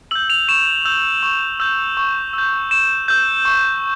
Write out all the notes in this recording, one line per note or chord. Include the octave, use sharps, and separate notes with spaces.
E6 G6 F#7
F7
C#6 E7
E6 G6
C#6
E6 G6
C#6
E6 G6
C#6 E7
E6 G6
C#6